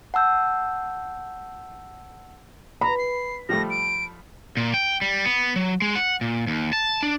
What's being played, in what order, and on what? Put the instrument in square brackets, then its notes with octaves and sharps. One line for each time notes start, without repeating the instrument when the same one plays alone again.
[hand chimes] F#5 A5 E6 G6
[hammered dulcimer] B4 [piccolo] A#5 [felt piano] B5
[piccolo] C7
[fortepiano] F3 G3 A3 [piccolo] A#6
[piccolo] D7
[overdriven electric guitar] A#2
G5
G3
B3
F#3
G#3
F#5
A#2
D#2
A5
D4